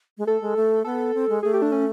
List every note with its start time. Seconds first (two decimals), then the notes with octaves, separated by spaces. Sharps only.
0.18 G#3
0.27 A3 A4
0.41 G#3
0.56 A3
0.84 B3 A4
1.14 C4
1.29 G#3
1.43 A3 G#4
1.53 G4
1.62 D4
1.72 C#4